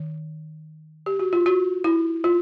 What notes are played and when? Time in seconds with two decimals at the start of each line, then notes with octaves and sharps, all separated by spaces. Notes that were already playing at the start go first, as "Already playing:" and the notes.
Already playing: D#3
1.06 G4
1.19 F#4
1.33 F4
1.46 F#4
1.84 E4
2.24 F4